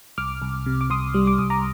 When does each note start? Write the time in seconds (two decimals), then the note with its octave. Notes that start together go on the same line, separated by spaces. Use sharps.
0.18 C2 D6 F6
0.42 C2
0.66 C3
0.81 D6
0.90 C2 C6 D#6
1.14 G3
1.27 D6
1.38 C2 D#6
1.50 A#5 D6